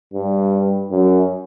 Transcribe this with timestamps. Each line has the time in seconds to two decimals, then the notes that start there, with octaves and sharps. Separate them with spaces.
0.13 G2
0.91 F#2